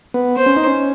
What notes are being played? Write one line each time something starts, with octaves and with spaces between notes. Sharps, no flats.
B3
C5
C#4
D#4
C#4